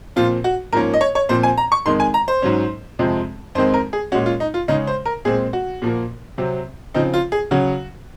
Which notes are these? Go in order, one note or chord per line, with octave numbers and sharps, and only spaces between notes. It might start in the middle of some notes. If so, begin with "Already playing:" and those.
A#2 F3 C4 F4
F#4
G#2 F3 A#3 C#4 A#4
D#5
C#5
C#5
A#2 F3 C4 C5
G#5
A#5
C#6
F2 D#3 G#3 C6
G#5
A#5
C5
G#2 F#3 C#4
F2 C3 F3 G#3 C4
F2 D#3 G#3 C4 C5
A#4
G#4
A#2 G#3 C#4 F#4
F4
D#4
F4
C#3 G#3 C#4 D#4
C5
A#4
A#2 G#3 C4 G#4
F#4
A#2 F3 A#3
C3 F#3 C4
C#3 F3 C4 D#4
F4
G#4
C#3 F#3 C#4 F#4